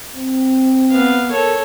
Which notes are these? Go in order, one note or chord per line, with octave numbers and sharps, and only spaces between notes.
C4
B3 F5
A4 A#4 C#5